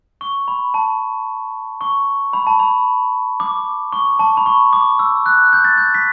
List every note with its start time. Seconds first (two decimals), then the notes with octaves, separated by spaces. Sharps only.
0.21 C#6
0.48 B5
0.74 A5
1.81 C#6
2.33 B5
2.47 A5
2.59 B5
3.40 D6
3.92 C#6
4.19 A5
4.37 B5
4.46 C#6
4.73 D6
4.99 E6
5.26 F#6
5.53 G6
5.65 A6
5.77 G6
5.94 B6